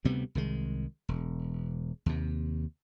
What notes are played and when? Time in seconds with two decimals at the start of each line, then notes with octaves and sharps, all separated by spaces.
0.05 D2 C3 G3 B3
0.35 C2 D#3 G#3
1.09 E1
2.06 D#2 C3